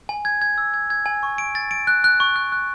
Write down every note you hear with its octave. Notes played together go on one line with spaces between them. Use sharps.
G#5
G#6
G#6
E6
G#6
G#6
G#5
C#6
D7
A6
D7
F#6
F#6
C#6
F#6
F#6